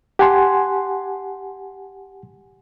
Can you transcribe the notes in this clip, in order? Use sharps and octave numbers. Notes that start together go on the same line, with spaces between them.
G4 F#5 G#5 A5 C6